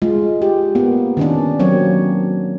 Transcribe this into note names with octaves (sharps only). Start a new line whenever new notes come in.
G#3 F4
G4
A#3 B3
D#3 C#4 D4
F#3 A#3 C4 C#5